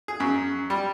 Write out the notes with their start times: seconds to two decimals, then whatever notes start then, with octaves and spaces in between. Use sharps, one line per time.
0.08 G#4
0.20 F#2
0.70 G3